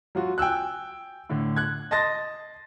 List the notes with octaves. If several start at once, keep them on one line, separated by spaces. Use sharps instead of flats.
F#3 F4 F#4
G5 G#5 E6 F#6
A2 D3
F#6 G#6
D#5 A5 C6 A6 A#6